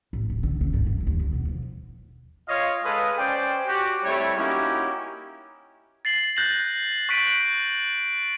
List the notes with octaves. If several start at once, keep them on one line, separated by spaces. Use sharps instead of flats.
A1
D1
D3
C#3
G2
E3
D#2
D3
B2
F3
F4 C#5 D#5 F5
G#3 A4 B4 F5 D#6
C#4 C5 D5 G5
F#4 G4
G3 A3 C4 E4 C#5
A#3 C#4 D#4 E4 F#4 G4
A6 C7 F#7
F#6 G6 A6 A#6 F#7
C#6 F#6 B6 D7 D#7 F#7